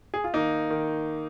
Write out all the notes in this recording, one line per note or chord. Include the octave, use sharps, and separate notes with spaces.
G#4
F4
D#3 A#3 D#4
D#3